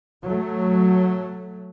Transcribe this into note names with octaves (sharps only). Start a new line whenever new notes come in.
F#3 A3